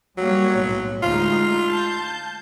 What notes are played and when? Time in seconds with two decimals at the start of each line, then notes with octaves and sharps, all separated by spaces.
0.18 F#3 G3 A#3 C#5
0.56 B1 A2
1.03 D2 G#3 D#4 F4
1.70 A5 G6